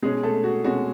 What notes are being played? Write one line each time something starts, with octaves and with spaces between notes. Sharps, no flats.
B2 G#3 C#4 G#4
A3 A4
F#4
B2 G#3 C#4 F#4